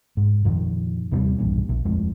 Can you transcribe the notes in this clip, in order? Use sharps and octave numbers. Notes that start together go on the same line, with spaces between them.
G#2
F2 A#2 D#3 F3
D#2 A2 C3 G3
B1 E2 G2 A#2
A#1
D#1 F2 A2 G#3